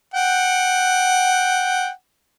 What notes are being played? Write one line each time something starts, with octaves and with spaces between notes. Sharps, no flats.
F#5 G5